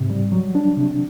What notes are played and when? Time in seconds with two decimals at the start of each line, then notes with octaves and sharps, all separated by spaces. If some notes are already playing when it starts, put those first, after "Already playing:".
Already playing: G#2 C3
0.10 G3
0.32 F#3
0.55 D4
0.76 C3